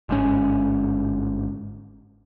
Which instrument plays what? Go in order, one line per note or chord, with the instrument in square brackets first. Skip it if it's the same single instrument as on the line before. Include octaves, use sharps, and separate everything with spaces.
[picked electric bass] G1 G#2 C#4